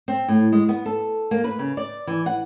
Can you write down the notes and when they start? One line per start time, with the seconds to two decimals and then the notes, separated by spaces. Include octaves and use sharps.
0.08 C4
0.28 A2
0.52 G#3
0.69 B3
0.86 A4
1.31 A#3
1.44 B4
1.59 C#3
1.77 D5
2.07 E3
2.26 F#5